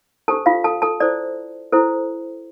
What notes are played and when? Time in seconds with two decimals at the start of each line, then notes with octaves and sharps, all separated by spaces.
0.28 D4 G4 A4 C5 A5
0.46 F4 F5
0.64 A4 A5
0.82 A4 A5
1.00 E4 A4 C5 D5
1.72 E4 A4 C5